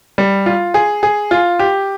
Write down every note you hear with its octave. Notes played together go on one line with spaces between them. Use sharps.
G3
F4
G#4
G#4
F4
G4